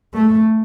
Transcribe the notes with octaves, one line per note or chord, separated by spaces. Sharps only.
A3